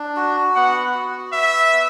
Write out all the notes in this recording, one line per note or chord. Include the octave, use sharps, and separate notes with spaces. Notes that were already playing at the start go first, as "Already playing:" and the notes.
Already playing: D4
F#4
B3 F#5
F#4
B4 E5
B3